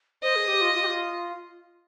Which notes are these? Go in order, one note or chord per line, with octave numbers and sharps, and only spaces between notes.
C5 D#5
G#4
G4
F4
F4
G4
F4